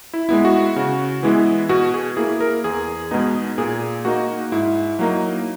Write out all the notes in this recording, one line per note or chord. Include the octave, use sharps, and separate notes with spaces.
E4
G#3 B3 E4
F#4
C#3
E3 G#3 B3 E4
B2 F#4
G#4
A#3 E4 G#4
A#4
E2 G#4
B2 G#3 B3 D#4
A#2 G#4
A#3 D#4 F#4
G#2 E4
F#3 A#3 D#4